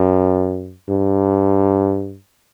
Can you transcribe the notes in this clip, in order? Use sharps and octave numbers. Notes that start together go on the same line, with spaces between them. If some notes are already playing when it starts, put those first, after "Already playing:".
Already playing: F#2
G2